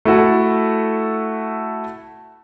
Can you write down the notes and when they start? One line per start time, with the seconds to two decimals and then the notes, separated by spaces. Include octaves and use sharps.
0.05 A3 E4 F#4 A4